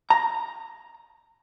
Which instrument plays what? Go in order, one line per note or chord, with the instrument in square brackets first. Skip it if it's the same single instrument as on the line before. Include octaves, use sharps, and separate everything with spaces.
[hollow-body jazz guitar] A#5